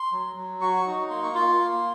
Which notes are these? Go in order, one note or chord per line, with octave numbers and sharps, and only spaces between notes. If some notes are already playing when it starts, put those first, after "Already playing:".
Already playing: C6
F#3
F#3
F#4 C#6
D#4
A#3 C6
C#6
F4 C6
A#3